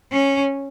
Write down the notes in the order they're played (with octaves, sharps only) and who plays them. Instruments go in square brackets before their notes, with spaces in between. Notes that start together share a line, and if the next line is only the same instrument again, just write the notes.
[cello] C#4